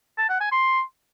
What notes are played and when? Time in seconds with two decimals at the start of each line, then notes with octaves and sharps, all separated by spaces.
0.18 A5
0.29 F#5
0.40 G#5
0.51 C6